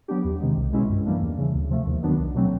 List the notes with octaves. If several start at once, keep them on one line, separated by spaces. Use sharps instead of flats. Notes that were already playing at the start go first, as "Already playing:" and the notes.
F#3 B3 D4 G4
E2
C3 D#3 G#3
C2
B2 G#3 C#4 E4
G2
E3 G3 A#3 D4
E2
C#3 E3
D2
C3 F3 A3
D#2
D#3 F#3 B3 D4
C2
B2 F#3 A3 C4